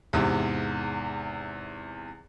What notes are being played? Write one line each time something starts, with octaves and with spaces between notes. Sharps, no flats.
E2 G#2 C3